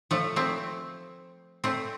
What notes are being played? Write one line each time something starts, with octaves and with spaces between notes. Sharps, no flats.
F3 A3
A3 C4
A3 C4